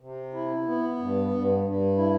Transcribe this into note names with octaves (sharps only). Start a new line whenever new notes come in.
C3
E4
B3
G2
G2
G2
E4